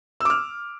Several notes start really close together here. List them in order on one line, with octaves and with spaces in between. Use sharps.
E6 D6 F6